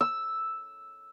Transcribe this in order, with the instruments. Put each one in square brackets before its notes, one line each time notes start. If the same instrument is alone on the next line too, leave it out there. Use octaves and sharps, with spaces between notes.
[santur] E6